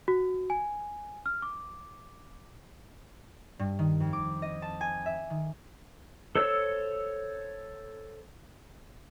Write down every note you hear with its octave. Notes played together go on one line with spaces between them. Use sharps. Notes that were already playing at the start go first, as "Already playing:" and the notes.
F#4
G#5
F6
D6
G2
D#3
F2
D6
D#5
A5
G#5
E5
D#3
A4 C5 C#5 E6